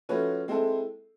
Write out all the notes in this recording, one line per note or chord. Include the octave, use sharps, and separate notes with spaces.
F3 A3 C#4 F#4 B4
G#3 C4 E4 A4